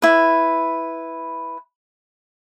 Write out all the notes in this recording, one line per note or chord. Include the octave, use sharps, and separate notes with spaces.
E4 B4